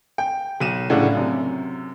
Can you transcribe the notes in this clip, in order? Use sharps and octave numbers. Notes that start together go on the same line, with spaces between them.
G5
B1 D#7 E7
F1 A2 C#3 D4 F#5
F#2 C3